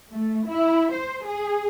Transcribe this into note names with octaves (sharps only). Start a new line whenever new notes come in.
A3
E4
C5
G#4